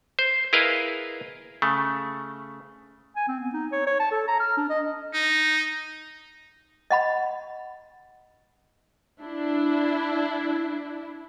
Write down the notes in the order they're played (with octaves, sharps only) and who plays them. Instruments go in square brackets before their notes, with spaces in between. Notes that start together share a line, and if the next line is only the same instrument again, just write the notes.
[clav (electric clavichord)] C5
E4 G#4 A#4 B4 D#5 F5
C#3 A3
[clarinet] G#5
C4
B3
D#4
C#5
C#5
A5
A4
A#5
F6
D4
D#5
[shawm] D#4
[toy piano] D#5 F#5 B5
[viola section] D4 E4